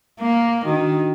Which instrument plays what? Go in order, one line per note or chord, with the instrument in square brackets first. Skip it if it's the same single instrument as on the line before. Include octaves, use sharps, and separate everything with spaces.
[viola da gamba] A#3
[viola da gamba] D#3 [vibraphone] D4 F#4